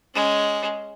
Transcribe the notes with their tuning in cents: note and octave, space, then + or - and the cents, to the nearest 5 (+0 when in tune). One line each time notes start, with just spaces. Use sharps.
G#3 +0 C#4 +0